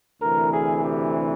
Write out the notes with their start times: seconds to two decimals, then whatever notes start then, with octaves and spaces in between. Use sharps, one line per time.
0.22 D2 C3 E3 A#4
0.53 G#4
0.85 G4